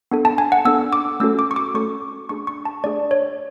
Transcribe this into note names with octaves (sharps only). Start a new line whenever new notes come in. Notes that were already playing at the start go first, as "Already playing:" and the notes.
B3 D4 A4
A5
G#5
F#5
B3 D4 A4 E6
D6
A3 C#4 F#4 A4 E6
D6
C#6
D6
A3 C#4 F#4 A4 C#6
A3 D4 G#4 C#6
C#6
A5
A3 D4 G#4 D5
C#5